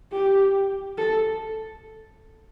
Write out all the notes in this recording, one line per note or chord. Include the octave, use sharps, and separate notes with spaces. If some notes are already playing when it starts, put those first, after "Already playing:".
G4
A4